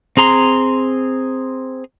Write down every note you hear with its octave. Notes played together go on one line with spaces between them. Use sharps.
C4 G#4 A#5 C6